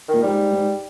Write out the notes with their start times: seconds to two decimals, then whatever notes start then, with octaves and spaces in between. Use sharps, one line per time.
0.08 A#2 D#3
0.22 G#2 G3
0.52 G#2